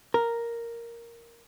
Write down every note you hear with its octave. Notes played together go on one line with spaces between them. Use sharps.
A#4